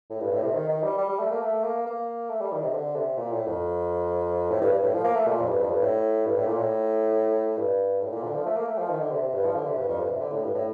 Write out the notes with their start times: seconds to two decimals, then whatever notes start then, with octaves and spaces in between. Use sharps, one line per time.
0.10 A2
0.20 G2
0.32 A2
0.43 C3
0.54 D#3
0.68 D#3
0.83 G3
0.98 G3
1.09 G3
1.20 A3
1.31 A#3
1.42 A3
1.64 A#3
1.86 A#3
2.30 A3
2.41 G3
2.52 D#3
2.63 C3
2.74 D3
2.96 C3
3.17 A#2
3.32 A2
3.47 F2
4.50 A2
4.61 G2
4.72 G2
4.83 A2
4.94 F3
5.04 A#3
5.16 A3
5.27 A#2
5.41 F2
5.48 G2
5.59 F2
5.71 G2
5.81 A2
6.25 G2
6.37 A2
6.47 A#2
6.58 A2
7.57 G2
8.02 A2
8.12 A#2
8.23 D3
8.35 F3
8.46 A3
8.57 A#3
8.67 A3
8.78 F3
8.90 D#3
9.01 D3
9.12 C3
9.22 C3
9.34 G2
9.45 F3
9.55 D3
9.67 C3
9.78 G2
9.88 F2
10.00 G2
10.10 C3
10.21 D3
10.32 A2
10.44 G2
10.54 A2